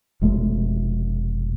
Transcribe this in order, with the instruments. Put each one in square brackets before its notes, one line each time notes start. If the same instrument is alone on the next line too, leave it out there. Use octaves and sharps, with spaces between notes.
[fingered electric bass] F1 B2 G#3 A3